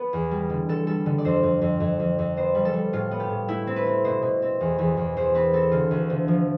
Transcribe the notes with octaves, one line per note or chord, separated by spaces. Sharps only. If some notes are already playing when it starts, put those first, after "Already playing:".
Already playing: B3 B4
E2
G3
D3
D3 A4
G3 A4
D3
D5
F2 C5
F2
F2
F2
F2
F2
B3 C5
G3
A4
G3
A2 F4
B3
G4
A2
A3 E4
C4
B4
C4
B2 C5
B2
C4
E2
E2
E2
E2 C5
C4 B4
C4 A4
D3 F4
D2
D3
F3